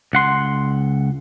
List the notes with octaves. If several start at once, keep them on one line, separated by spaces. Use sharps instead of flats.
C#2 F#5 C6